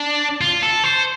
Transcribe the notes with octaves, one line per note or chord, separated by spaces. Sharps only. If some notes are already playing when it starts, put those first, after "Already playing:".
Already playing: D4
F4
A4
C5